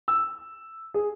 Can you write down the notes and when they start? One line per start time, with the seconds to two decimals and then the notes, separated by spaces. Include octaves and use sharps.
0.08 E6
0.94 G#4